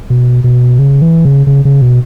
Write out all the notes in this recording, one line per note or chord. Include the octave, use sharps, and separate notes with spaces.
B2
B2
C#3
E3
C#3
C#3
C#3
B2